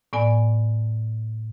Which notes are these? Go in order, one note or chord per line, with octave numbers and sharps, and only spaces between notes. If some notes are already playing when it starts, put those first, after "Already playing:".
A2 B3 D5 G#5